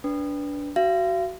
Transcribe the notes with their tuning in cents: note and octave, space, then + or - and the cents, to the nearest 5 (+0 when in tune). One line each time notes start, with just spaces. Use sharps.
D4 -20 B4 +0
F#4 +20 F5 -40